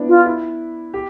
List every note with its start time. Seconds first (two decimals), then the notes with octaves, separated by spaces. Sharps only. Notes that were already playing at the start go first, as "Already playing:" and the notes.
Already playing: B3 D4 E4
0.09 F4
0.26 E4
0.94 G4